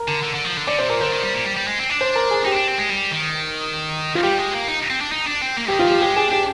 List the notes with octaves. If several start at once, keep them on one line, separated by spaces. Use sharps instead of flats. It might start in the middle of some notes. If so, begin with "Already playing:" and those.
Already playing: A#4
D3
D3
D3
F3
D3
D3 D5
C3 C5
A#2 A#4
D3 C5
D#3
G3
A#2
G3
G3
G#3
C4
D4
C5
A#4
G#4
D#4 G4
C4
D4
C4
G#3
G3
D#3
F4
G3 G4
G#3
A#3
D#4
C4
D4
D#4
D4
C4
A#3
D#3 G4
F4
F3 G4
G#3 G4
D4 G#4
D4 G4